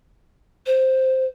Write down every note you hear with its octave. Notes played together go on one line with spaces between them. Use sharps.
C5